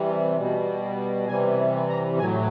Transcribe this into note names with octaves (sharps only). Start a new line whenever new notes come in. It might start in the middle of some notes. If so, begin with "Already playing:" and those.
Already playing: C3 E3 G3
B2 G3
C3 E3 G3 G#5
A#5
A2 F#3 G#5